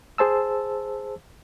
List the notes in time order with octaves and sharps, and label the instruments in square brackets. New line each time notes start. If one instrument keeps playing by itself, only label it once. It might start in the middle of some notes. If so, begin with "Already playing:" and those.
[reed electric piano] G#4 C5 A5 E6